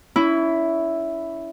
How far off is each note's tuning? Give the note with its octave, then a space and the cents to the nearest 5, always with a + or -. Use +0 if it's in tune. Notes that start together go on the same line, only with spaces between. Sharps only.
C#4 +35 E4 +0